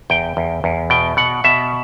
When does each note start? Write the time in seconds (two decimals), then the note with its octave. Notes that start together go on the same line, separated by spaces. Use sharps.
0.10 E2 G5
0.37 E2
0.64 E2
0.90 B2 G5
1.17 B2 F#5
1.44 B2 E5